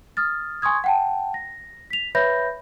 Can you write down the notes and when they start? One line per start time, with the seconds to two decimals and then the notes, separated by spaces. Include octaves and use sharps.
0.17 D#6 F6 A6
0.62 G#5 C6 C#6 D#6 G#6
0.84 F#5 G5 A5
1.34 A#6
1.90 B6 F7
2.15 B4 C#5 E5 B5 G6 A#6